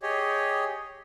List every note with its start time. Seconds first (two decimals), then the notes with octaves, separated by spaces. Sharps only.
0.02 G4 G#4 C#5 D#5